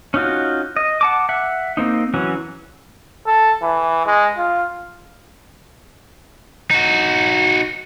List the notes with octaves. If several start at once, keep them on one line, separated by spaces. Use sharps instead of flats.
C#4 D#4 F4 F#4
D#5
F#5 A5 D6
E5 F#5
A#3 C4 D#4
E3 F#3 C#4 F#4
A4
E3
G#3
F4
D#4 F#4